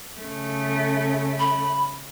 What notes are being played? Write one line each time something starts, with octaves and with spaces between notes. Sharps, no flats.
C#3 A3
B5